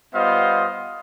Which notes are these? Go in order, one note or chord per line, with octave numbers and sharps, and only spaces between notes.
G3 B3 F4 C5 D#5 F5